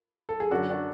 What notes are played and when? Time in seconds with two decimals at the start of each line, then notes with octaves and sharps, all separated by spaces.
0.29 A4
0.40 G#4
0.51 F#2 D3 D4 F#4
0.70 D4 F#4